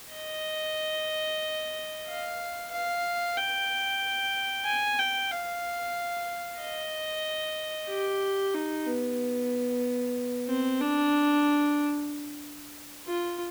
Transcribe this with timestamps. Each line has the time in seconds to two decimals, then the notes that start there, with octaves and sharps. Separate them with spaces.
0.14 D#5
2.08 F5
2.72 F5
3.37 G5
4.66 G#5
4.99 G5
5.31 F5
6.60 D#5
7.89 G4
8.54 D#4
8.86 B3
10.49 C4
10.81 D4
13.07 F4